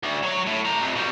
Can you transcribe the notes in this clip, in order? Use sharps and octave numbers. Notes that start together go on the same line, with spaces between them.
D2
F#3 C#5
A2
G4 A#5
F2 A3
B2 G3